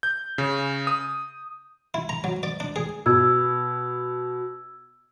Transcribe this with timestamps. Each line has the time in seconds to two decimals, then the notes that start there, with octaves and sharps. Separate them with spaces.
0.03 G6
0.38 C#3
0.87 D#6
1.94 E4
2.09 A#5
2.24 F#3
2.43 D5
2.60 D4
2.76 G#4
3.06 B2 E6 G#6